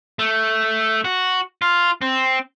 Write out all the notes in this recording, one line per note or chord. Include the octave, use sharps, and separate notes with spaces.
A3
F#4
F4
C4